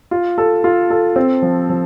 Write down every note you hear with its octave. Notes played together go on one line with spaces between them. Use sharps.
F4
A4
F4
A4
C4
F3
F3